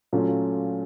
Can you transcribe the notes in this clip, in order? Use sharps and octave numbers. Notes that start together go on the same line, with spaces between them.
A#2 F#3 A3 C#4 F4